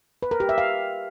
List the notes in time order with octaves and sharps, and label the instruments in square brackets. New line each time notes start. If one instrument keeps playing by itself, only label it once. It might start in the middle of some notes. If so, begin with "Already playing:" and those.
[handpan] B4
A#4
G4
E5
F5